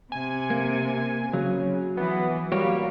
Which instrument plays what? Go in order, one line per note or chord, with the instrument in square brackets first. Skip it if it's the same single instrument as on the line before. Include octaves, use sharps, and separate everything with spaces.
[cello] C3 [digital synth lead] G#5
[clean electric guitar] A#3
[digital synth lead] C#3 [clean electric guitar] F#3
[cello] E3 [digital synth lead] B3
[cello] G3 [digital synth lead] A#3 [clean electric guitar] F#4 G4 C#5